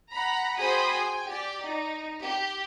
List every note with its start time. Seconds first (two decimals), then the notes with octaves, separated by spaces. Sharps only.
0.11 F#5 A#5 B5
0.57 F#4 G#4 C5 G5 B5 D#6
0.95 G5 G#5
1.28 G4 D5
1.66 D#4
2.24 G4